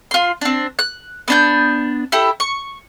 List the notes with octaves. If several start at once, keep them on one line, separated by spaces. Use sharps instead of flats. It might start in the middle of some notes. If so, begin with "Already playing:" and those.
F4 C6
C4 D4
F#6
B3 D4 G6
E4 G4 A4
C#6